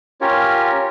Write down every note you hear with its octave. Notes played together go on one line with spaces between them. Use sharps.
C#4 F4 G4 A#4 C#5